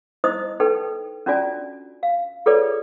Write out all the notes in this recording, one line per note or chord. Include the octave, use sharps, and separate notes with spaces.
D#4 E4 C5 D#5 D#6
D#4 A4 B4 G5
C#4 D4 F4 F#4 D5 G#5
F5
F4 G#4 A4 B4 C#5 D5